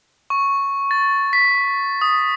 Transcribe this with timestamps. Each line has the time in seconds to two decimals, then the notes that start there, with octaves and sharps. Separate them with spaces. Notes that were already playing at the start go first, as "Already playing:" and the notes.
0.30 C#6
0.91 A6
1.33 B6
2.01 D#6